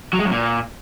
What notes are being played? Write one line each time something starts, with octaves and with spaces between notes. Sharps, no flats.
F#3
G#3
F#2
A#2